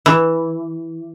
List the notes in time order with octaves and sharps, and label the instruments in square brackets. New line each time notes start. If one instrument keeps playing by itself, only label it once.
[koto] E3